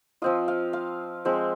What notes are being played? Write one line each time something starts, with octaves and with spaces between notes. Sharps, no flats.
F3 C4 F4 D#5
F5
F5
F3 G#3 C4